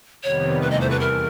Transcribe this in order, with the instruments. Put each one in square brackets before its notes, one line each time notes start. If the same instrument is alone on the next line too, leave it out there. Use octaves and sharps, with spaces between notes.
[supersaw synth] F2 C3 D#3 G3 B3 [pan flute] C#5
[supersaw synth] E2 C3 E3 A3 [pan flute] B4
[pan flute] D#5
C5
B4
A#4